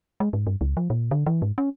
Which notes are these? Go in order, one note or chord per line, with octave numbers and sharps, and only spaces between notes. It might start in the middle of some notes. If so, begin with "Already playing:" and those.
G#3
G#2
G2
C#2
F3
A#2
D3
E3
G#2
C#4